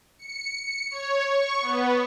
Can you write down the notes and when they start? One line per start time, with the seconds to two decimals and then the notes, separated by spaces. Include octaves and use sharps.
0.18 C#7
0.91 C#5
1.25 C#6
1.61 B3